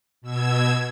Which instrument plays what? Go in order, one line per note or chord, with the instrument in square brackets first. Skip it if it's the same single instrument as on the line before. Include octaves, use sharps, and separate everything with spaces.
[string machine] B2 E6 G#6